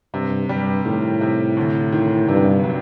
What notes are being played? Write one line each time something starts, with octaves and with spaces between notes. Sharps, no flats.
G2 C3
G2 G3
A2 D#3
C3
D2
D#3
G2 C3
F#3